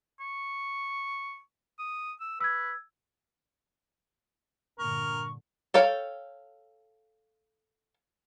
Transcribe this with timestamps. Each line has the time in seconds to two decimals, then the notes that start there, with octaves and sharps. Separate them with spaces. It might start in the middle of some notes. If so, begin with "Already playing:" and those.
0.20 C#6
1.79 D#6
2.20 E6
2.40 B4 E6 G#6
4.79 G2 A#2 D3 A#4 C#6
5.74 A4 C#5 F5 G5